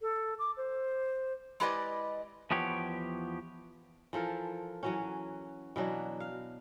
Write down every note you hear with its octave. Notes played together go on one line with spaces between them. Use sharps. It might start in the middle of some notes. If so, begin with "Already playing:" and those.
A4
D6
C5
G#3 E4 G4 B4 D5 D#5
E2 F3 B3 G4 C#5
E3 F3 A4 A#4
E3 F#3 C#4
B2 E3 F#3 D4
F5